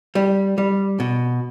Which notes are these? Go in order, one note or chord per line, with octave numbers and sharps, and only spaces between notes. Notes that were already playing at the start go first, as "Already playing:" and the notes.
G3
G3
B2